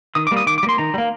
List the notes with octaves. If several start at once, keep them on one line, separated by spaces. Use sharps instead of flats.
D#3 D#6
D6
G3 A#3
D#6
D#3 D6
D6
G3
A#3 C6
D#3 A#5
G3
A#3